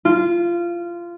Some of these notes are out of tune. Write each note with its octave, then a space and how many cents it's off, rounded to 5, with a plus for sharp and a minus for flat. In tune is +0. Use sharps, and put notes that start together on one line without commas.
F4 -20